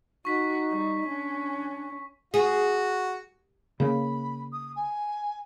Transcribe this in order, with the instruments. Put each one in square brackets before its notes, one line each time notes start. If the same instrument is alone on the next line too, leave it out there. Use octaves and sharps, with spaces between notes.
[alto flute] D#4 [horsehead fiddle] F#4 [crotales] C#6 B6
[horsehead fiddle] G3
[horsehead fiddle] C#4 [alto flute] D4
[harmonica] F#4 [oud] G#4
[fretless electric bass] C#3 A#3 [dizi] B5
[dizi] D#6
G#5